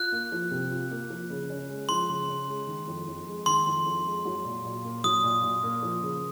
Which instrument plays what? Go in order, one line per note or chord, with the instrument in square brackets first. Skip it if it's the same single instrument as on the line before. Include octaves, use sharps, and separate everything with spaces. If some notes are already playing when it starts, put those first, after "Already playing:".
Already playing: [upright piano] F4 [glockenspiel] F#6
[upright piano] A#3
F3
C3
F4
A#3
F3
C#3
C#4
G#3
[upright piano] F3 [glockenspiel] C6
[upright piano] C#3
C#4
G#3
D#3
F2
F2
G#3
[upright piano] D#3 [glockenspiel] C6
[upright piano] F2
F2
G#3
F#3
A#2
A#2
A#3
[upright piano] F#3 [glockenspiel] D#6
[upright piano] A#2
A#2
A#3
F3
C#3